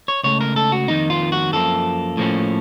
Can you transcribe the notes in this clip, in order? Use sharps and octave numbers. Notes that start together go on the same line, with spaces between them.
C#5
C#2 C#3 A3 C#5
A#4
A4
F#4
F2 D#3 A#3 D#4
F4
F#4
F#2 F3 A#3 A4
A2 F3 A#3 C#4